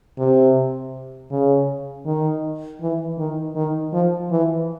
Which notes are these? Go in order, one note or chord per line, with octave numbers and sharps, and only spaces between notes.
C3
C#3
D#3
E3
D#3
D#3
F3
E3